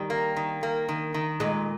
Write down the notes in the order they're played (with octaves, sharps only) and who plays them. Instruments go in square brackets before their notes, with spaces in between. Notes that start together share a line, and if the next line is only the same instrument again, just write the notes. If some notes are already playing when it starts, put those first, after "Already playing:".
Already playing: [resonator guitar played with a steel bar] D#3 [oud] G3
[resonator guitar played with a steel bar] A#3
D#3
A#3
D#3
D#3
[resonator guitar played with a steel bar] A#2 [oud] G#3